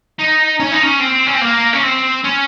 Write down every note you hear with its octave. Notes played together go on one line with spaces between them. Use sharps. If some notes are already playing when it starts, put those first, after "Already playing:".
D#4
C#4
D#4
C#4
C4
C#4
C4
A#3
C#4
C4
C#4